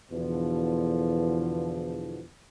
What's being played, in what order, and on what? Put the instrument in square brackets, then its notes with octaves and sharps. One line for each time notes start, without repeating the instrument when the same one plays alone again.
[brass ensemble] E2 B2 D3 F3